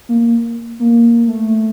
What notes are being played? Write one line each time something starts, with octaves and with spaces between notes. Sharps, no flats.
A#3
A#3
A3